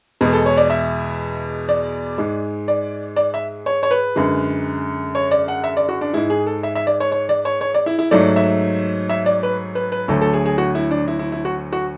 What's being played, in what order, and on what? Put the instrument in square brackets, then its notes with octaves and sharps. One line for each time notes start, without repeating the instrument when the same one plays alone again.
[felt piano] E2 B2 G#3
A4
C#5
D5
E5
D5
G#2 G#3
D5
D5
E5
C#5
C#5
B4
F#2 D3 G#3
C#5
D5
F#5
E5
D5
F#4
D4
G#2 G#3 E4
G#4
A4
E5
E5
D5
C#5
C#5
D5
C#5
C#5
D5
E4
E4
G#2 F#3 A3 D5
E5
E5
D5
B4
B4
B4
D2 D3 F#3 A3 A4
A4
G#4
G#4
F#4
E4
D4
E4
E4
E4
F#4
F#4